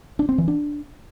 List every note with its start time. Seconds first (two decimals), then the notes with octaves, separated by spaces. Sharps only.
0.19 D4
0.29 C4
0.38 E3
0.48 D4